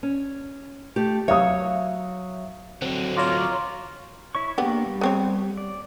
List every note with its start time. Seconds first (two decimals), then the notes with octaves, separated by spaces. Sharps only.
0.03 C#4
0.96 A3 G4
1.28 F#3 C#5 E5 F5 D#6
2.82 D3 F#3 C4
3.17 F4 C#5 A#5 D6
4.35 E4 C#5 C#6
4.58 A#3 B3 D4 G4
4.86 G3
5.01 B3 C4 C#5
5.57 D5